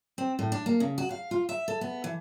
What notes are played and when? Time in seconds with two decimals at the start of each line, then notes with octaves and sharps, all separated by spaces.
0.18 C4
0.39 A2
0.52 D4
0.66 A#3
0.80 C#3
0.98 F#4
1.11 F5
1.31 F4
1.49 E5
1.68 A4
1.81 B3
2.04 E3